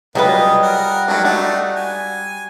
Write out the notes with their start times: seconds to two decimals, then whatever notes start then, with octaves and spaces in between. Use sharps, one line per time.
0.15 F#3 G3 B3 F4 G#4 B4 D#5
0.62 A#4 F#5
1.08 F#3 D4 G4
1.24 A3 D4 D#4 F#4
1.76 G#5